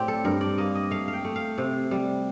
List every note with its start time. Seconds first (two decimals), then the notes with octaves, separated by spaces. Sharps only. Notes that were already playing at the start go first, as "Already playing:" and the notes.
Already playing: A2 C4 G4 D5
0.08 A4
0.25 G2 A#4
0.41 D5
0.58 A#3 D#5
0.75 D#5
0.91 A3 F5
1.08 F5
1.13 G5
1.25 A3
1.36 F5
1.58 C3
1.91 G3